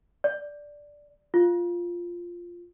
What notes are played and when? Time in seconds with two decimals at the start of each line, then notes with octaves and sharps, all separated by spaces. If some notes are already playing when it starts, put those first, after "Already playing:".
0.24 D5
1.34 F4